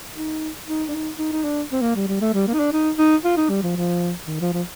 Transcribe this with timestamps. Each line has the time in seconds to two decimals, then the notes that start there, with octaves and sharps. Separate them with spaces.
0.14 D#4
0.66 D#4
0.88 D4
0.92 D#4
1.18 D#4
1.32 D#4
1.44 D4
1.72 C4
1.82 A#3
1.96 G3
2.08 G3
2.21 A3
2.34 G3
2.47 A#3
2.54 D#4
2.60 D4
2.73 D#4
2.98 D#4
3.25 F4
3.37 D#4
3.50 G3
3.63 F3
3.76 F3
4.27 D#3
4.41 F3
4.53 F3